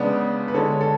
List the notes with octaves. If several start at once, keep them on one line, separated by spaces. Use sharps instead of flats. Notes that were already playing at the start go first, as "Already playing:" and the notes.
Already playing: C#3 G#3 B3 D4
B4
D3 G#3 A4 C#5
A4